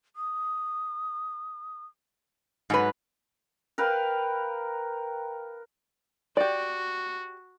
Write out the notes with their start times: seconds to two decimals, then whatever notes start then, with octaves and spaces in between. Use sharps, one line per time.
0.16 D#6
2.70 G#2 F#3 B4
3.78 A#4 B4 F5 G5
6.37 F#4 G4 D5